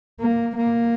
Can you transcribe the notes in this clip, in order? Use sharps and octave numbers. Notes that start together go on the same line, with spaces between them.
A#3
A#3